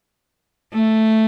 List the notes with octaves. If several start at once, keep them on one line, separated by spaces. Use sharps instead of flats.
A3